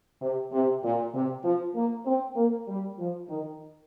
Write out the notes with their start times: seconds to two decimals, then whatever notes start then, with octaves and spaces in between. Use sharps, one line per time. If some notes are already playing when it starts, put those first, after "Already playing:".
0.22 C3
0.53 C3
0.84 A#2
1.14 C3
1.44 F3
1.75 A#3
2.06 C4
2.36 A#3
2.68 G3
2.98 F3
3.29 D#3